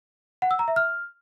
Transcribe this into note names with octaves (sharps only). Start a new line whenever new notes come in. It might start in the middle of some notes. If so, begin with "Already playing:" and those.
F#5
E6
A#5
E5
F6